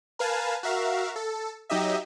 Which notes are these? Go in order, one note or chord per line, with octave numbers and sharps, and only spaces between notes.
A#4 B4 F5 G#5 A5
F#4 A#4 E5 F5
A4
F#3 D#4 G4 D#5 E5